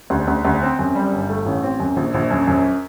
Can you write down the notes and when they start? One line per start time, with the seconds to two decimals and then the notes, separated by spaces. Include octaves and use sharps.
0.10 D2
0.27 D2
0.45 D2
0.62 C4
0.79 F#2
0.95 G3
1.12 G1
1.29 A3
1.46 A1
1.63 C4
1.80 F#2
1.96 A#1
2.14 A#1
2.31 F#2
2.47 F#2